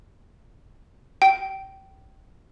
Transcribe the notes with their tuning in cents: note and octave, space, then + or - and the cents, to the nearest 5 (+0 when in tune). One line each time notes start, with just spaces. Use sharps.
G5 -25